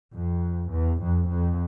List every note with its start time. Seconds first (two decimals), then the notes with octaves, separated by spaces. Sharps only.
0.12 F2
0.72 E2
1.02 F2
1.31 F2